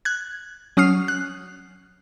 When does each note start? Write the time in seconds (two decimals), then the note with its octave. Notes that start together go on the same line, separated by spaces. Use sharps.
0.05 F#6 G#6
0.77 F#3 C#4 D#6 F6 C7
1.08 F#6